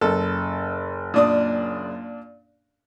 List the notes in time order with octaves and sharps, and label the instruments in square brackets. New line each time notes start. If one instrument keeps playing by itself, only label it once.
[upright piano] F#1 [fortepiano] A4
[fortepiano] A#2 D4 D#6